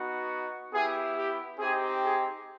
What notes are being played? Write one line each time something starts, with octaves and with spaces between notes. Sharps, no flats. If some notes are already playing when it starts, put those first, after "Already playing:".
Already playing: B3 D#4 F#4
B3 E4 G4 G#4
G4
C4 D#4 G4 G#4
G#4